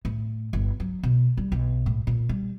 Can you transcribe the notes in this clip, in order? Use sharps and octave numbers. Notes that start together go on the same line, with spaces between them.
A2
G1
F#3
B2
G3
B1
A2
A#2
G3